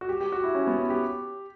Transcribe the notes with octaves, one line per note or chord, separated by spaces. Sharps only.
F#4
G4
G4
F#4
E4
C#4
B3
C#4
G4